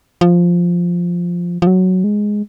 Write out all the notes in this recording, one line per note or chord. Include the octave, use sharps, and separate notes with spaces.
F3
F3
F#3
G#3